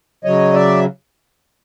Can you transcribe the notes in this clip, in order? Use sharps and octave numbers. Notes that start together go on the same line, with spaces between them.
C#3 F#3 C#5 D#5
D5 E5